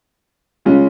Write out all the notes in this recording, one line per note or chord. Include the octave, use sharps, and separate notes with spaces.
C#3 G#3 C#4 F4